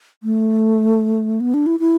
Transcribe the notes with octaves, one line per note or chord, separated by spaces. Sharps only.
A3
B3
D4
E4
E4